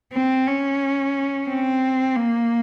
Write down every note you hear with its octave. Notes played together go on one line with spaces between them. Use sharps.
C4
C#4
C4
A#3